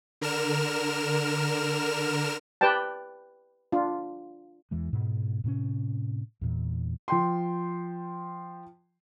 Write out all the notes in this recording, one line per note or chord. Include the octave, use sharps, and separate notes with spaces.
D3 A#4 F6 E7
G4 B4 D5 G5 A5
D4 F4
E2 E3 G#3
G#2 B2
A2 C3 C4 C#4
E2 A#2 E3
F3 G5 C6